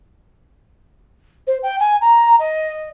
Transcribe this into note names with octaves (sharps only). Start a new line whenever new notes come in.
C5
G5
G#5
A#5
D#5